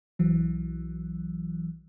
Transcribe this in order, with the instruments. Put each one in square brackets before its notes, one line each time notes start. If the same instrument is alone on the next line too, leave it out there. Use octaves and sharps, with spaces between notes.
[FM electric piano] B1 E3 F#3